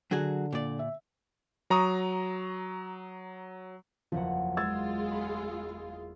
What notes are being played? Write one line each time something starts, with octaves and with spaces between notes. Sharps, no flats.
D3 F#3 F#4 G#4
A#2 D5
E5
F#3 A#5 C#6 D#6
F#1 E2 F3 F#5
G#3 F4 E6 G#6 A6
B5